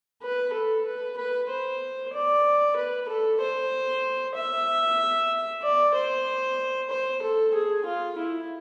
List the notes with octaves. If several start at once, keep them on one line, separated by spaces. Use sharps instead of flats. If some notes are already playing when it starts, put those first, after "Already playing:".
B4
A4
B4
B4
C5
D5
B4
A4
C5
E5
D5
C5
C5
A4
G#4
F4
E4